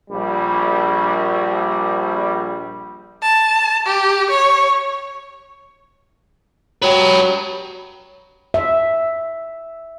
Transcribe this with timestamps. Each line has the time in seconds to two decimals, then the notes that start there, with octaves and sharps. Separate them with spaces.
0.10 A#1 G3
3.22 A5
3.86 G4
4.30 C#5
6.83 F#3 G4 B4
8.54 E5